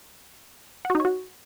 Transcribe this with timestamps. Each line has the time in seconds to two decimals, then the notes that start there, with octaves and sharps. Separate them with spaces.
0.85 F#5
0.90 F#4
0.95 D#4
1.00 C#5
1.05 F#4